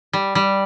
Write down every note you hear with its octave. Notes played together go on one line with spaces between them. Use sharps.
G3
G3